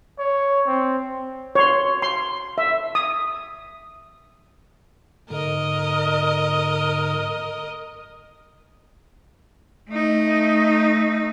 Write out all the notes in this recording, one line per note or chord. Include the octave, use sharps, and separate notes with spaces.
C#5
C4
C#5 C6
C6
E5
D#6
G#2 D3 A#4 D#5
A3 D#4